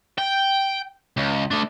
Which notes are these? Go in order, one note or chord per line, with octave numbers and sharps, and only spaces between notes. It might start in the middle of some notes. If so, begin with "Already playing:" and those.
G5
C#2
A3 D4